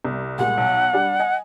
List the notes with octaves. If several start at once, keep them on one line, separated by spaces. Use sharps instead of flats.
C2
A#2 G3 G#3 F#5
B1
G3 D4
D#5 G#5